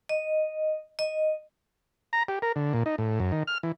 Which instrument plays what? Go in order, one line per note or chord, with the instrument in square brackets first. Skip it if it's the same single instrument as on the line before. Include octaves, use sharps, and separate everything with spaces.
[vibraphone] D#5
D#5
[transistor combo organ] A#5
G4
A#4
D3
A#2
D#4
A2
F#2
D#3
F6
E3